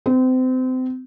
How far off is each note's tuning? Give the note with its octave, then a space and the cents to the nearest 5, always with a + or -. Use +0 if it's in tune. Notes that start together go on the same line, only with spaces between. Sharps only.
C4 -30